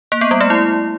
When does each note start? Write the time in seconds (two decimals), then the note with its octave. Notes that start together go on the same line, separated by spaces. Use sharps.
0.12 A#3
0.21 B3
0.31 G3
0.41 A3
0.50 E4